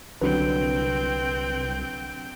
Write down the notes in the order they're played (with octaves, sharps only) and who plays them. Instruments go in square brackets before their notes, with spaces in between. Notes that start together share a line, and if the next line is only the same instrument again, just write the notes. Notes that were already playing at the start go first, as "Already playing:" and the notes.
[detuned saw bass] C2 [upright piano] D3 F#3 [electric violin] C4 G5 [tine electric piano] B4